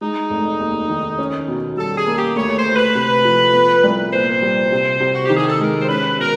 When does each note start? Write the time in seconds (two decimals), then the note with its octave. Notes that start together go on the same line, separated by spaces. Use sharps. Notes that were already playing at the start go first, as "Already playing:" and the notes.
0.01 G#3 D#4
0.30 F1
0.60 D#2
0.89 D#3
1.18 C#4
1.48 B2
1.77 G3 A4
1.97 G#4
2.07 A#3
2.17 G4
2.36 D2 C#5
2.57 C5
2.66 D2
2.76 B4
2.95 C3
3.25 F3
3.54 B3
3.83 C2
4.13 A#2 C5
4.42 G3
4.72 C3
5.00 C3
5.14 F#4
5.26 D#3 G4
5.37 G#4
5.48 A4
5.60 G#3 A#4
5.81 C5
5.88 C#4 B4
6.18 B2 A#4